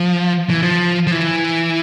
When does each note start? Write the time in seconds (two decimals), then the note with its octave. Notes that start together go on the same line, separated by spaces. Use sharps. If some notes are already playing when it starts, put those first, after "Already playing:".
Already playing: F3
0.50 E3
0.62 F3
1.07 F3
1.11 E3